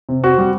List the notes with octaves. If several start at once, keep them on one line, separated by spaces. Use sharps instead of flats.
C3
C4 F#4
G3